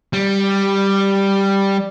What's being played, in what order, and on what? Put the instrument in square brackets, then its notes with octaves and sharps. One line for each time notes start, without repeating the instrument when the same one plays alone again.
[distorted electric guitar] G3